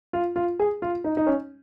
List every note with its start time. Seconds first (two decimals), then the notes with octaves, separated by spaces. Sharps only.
0.13 F4
0.36 F4
0.59 G#4
0.82 F4
1.04 D#4
1.17 D#4
1.27 C#4